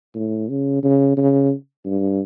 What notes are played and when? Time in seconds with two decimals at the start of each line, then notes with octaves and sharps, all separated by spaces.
0.15 A2
0.50 C#3
0.83 C#3
1.17 C#3
1.85 G2